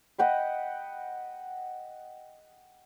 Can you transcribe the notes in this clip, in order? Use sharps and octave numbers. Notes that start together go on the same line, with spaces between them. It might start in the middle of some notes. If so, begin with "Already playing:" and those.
D#5 F#5 G5 B5